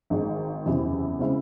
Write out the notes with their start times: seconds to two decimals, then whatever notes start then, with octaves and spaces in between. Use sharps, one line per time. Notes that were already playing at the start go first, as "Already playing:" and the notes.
0.10 G#1 G#2 D#3 G#3 D#4
0.65 F#1 E2 C3 E3
1.20 C#3 G#3 C4 E4